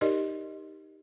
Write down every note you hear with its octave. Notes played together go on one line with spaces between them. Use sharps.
D#4 G4 A#4 D5 D#5